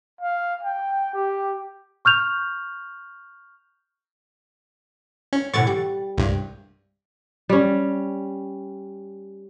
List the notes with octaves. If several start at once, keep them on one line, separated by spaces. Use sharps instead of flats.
F5
G5
G4
C#6 F6 G6 F7
C#4
B2 D3 E3 C#6 A6
G3
C2 G2
G3 C#4